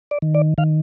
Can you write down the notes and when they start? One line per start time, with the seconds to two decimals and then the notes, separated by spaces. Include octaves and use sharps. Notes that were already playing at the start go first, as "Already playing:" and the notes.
0.11 D5
0.22 D#3
0.35 D5
0.58 D#3 F5